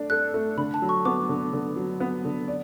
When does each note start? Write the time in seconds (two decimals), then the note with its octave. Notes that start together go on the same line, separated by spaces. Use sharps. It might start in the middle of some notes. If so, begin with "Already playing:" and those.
Already playing: A3 D4 D5
0.10 A4 F#6
0.34 A3
0.57 D3 B5
0.74 A5
0.82 F#3
0.89 C#6
1.05 B3 D6
1.29 D3
1.53 D3
1.76 F#3
2.00 B3
2.25 D3
2.48 D5